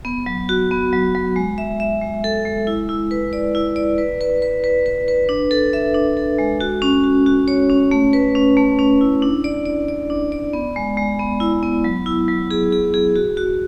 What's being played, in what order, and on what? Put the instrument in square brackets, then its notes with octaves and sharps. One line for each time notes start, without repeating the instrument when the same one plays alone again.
[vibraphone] B3
F#3
F#4
B3
F#3
F#3
G#3
E5
E5
G#3
A4
G#3
E4
E4
B4
D5
E4
D5
B4
B4
B4
B4
B4
B4
D4
A4
E5
D4
A4
G#3
F#4
C#4
F#4
F#4
C#5
C#4
A3
B4
C#4
A3
C#4
E4
D4
D5
D5
D5
D4
D5
B3
G#3
G#3
B3
E4
B3
F#3
E4
F#3
G#4
G#4
G#4
F#4
F#4